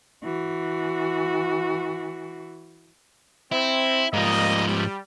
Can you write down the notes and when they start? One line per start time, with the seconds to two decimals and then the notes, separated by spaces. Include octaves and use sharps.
0.23 E3 F#4
3.52 C4 E4
4.13 G#2 F3 G3 A#3 D#5
4.68 G3